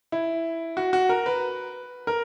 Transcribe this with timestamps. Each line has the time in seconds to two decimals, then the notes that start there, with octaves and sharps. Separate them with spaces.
0.12 E4
0.77 F#4
0.93 F#4
1.09 A#4
1.26 B4
2.07 A#4